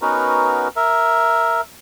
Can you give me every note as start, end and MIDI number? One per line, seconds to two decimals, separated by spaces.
0.02 0.68 59
0.02 0.68 61
0.02 0.68 63
0.02 0.68 66
0.02 0.68 70
0.02 0.68 71
0.76 1.61 70
0.76 1.61 76